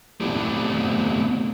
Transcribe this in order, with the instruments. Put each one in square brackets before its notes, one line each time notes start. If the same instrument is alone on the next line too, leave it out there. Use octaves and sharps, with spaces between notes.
[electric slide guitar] A3 B3 C4 D4 E4 G4